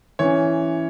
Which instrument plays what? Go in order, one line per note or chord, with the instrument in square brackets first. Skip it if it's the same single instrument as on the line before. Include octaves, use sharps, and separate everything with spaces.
[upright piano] E3 C#4 C#5